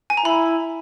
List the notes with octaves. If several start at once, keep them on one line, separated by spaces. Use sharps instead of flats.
G#5
A#5
E4 B5